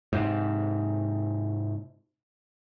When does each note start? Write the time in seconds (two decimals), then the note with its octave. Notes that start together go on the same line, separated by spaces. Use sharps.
0.13 G#2 C3